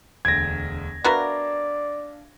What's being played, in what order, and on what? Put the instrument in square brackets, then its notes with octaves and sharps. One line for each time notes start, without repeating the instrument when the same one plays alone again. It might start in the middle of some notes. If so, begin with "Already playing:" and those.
[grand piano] E1 D2 D7 [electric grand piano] G#6 A#6
[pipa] B3 F#4 A#4 [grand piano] D4 E5 F5 [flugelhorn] D5